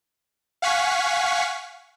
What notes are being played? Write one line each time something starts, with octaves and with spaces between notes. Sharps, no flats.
F5 F#5 G#5 C#6 B6